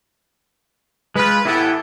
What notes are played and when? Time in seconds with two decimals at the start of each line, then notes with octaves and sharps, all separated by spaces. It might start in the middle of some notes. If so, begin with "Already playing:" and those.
1.16 G#3 F4 B4
1.45 A2 E3 B3 E4 G4 A4